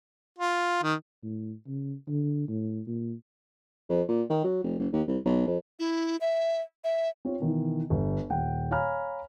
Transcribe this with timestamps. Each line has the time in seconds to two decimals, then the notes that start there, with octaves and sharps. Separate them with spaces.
0.38 F4
0.83 D#3
1.23 A2
1.67 C#3
2.07 D3
2.48 A2
2.87 A#2
3.89 F2
4.08 A#2
4.30 D#3
4.44 F#3
4.63 F1
4.79 F#1
4.93 D#2
5.07 C2
5.25 B1
5.47 F2
5.79 E4
6.21 E5
6.84 E5
7.25 C4 F4 C#5
7.40 B2 D#3 E3
7.90 G1 G2
8.30 D#1 F#5 G5
8.71 C#5 F5 G#5 A#5 B5 F6